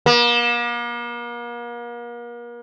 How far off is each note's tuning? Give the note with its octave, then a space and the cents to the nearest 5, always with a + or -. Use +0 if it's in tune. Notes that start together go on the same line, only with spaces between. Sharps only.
A#3 +40